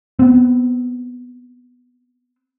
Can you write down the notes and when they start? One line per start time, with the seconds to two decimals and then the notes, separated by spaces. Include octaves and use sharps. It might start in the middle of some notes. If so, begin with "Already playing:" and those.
0.19 B3 C4